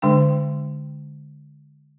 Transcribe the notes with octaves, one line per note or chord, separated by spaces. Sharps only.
D3 G#3 D4 G5